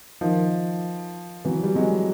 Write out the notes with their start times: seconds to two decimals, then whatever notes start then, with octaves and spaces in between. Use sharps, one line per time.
0.21 D#3 F3
1.45 E3 F#3
1.63 G3
1.75 F#3 G#3